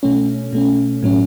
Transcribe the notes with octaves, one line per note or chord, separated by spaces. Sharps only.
B2 A3 C#4
B2 A3 C#4
A2 F#3 C#4